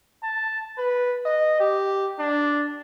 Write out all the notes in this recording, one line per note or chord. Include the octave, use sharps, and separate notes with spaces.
A5
B4
D#5
G4
D4